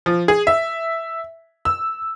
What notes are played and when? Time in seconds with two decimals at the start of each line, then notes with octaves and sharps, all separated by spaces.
0.06 F3
0.28 G#4
0.47 E5
1.65 E6